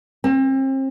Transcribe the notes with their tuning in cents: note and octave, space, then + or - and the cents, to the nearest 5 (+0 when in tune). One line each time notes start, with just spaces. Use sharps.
C4 +35